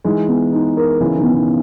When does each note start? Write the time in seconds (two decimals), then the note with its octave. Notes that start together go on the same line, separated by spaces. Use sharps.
0.04 E3 G#3 D#4
0.28 B3
0.53 D#4
0.77 A#4
1.00 C#3 E3 A#4
1.17 B2 D#3
1.24 B3
1.33 B2 D#3